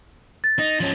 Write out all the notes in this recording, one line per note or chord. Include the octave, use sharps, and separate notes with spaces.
A6
D#4
F3 C#4